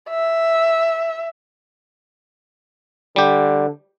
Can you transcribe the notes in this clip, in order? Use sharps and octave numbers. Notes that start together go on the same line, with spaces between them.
E5
D3 G3 G4